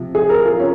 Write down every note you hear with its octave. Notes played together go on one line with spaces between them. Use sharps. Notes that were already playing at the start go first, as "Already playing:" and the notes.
Already playing: C3 F3
G#4
A#4
F4
C#4